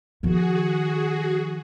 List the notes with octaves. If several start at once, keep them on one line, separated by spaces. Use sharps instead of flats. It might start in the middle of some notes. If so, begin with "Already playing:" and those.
D#3 F3 F#4 G#4